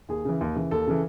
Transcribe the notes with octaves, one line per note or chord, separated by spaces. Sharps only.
D#2 G#4
C#3 E3
D#2
C#3 E3
D#2 A4
C#3 E3